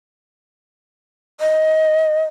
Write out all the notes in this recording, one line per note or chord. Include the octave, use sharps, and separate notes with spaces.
D#5